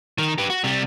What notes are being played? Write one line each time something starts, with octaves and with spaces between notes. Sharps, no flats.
D#3 A#4
G4 B4
F#4
C3 G3